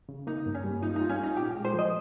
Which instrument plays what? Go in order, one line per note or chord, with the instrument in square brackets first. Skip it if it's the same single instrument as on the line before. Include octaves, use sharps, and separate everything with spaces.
[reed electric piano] C#3
[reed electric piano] A#3 [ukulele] D#4
[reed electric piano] G2
[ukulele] C#4
[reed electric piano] G3
[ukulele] D#4 [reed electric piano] F4
[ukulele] D#4
[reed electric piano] F4
[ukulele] C#4
[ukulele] D#4 [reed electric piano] F4
[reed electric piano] A#2 [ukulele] G4
[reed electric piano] G#3
[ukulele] C5
[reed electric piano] F3 [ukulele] D#5